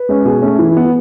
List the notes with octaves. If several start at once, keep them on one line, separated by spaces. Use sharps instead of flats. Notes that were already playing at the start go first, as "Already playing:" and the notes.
Already playing: B4
G#3 C#4
B2 G#4
A3 C#4
E3
B3